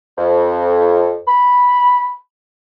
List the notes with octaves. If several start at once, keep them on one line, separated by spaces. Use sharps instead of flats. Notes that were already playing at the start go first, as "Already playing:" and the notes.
F2
B5